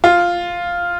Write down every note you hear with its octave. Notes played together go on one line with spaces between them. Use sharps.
F4